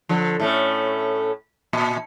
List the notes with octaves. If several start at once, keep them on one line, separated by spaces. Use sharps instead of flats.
D3 F3
A2 A3 C#4
A#2